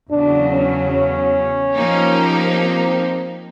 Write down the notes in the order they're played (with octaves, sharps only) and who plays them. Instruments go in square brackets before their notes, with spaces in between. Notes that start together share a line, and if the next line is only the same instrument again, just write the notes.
[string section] E2 C#3 F#3 [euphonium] D4
[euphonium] C#4
C#4
[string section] F3 A#3 D#4 G4
[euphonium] C4